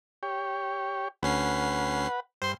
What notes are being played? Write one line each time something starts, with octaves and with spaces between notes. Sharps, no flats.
G4 C#5
D2 C#4 B4 F#5 C7
G2 C5 C6